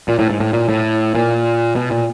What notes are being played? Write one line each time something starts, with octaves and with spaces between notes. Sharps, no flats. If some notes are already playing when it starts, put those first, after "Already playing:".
A#2
A2
G#2
A2
A#2
A2
A#2
B2
A#2